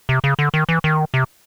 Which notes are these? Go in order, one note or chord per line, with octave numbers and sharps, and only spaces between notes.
C3
C#3
D3
D#3
E3
D#3
C3